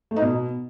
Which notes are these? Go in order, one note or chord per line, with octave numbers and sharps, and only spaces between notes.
A3
D#4
B2